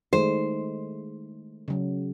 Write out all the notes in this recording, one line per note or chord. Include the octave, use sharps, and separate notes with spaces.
D#3 G#3 A3 C5
C#3 F#3